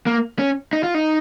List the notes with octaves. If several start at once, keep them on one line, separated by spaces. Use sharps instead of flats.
A#3
C#4
D#4
F4
D#4